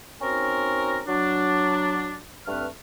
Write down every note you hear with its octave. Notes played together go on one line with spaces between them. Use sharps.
C4 C#4 D#4 F#4 A#4
F#3 D4
G2 A3 C4 B4 F6